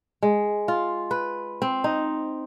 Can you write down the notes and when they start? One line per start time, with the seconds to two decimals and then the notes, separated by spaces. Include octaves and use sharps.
0.22 G#3
0.68 F4
1.11 B4
1.62 C4
1.84 D#4